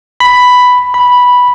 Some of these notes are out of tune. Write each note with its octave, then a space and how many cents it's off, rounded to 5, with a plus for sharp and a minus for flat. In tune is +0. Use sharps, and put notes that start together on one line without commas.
B5 +5
B5 -5